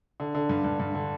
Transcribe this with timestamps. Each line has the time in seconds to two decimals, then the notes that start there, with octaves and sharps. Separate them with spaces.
0.20 D3
0.35 D3
0.49 G2
0.64 G2
0.80 G2
0.95 D3